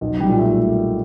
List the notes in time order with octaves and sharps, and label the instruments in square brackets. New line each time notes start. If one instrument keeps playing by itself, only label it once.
[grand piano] B1
G3
A#2
A3